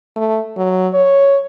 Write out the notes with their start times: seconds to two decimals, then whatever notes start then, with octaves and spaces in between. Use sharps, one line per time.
0.16 A3
0.57 F#3
0.94 C#5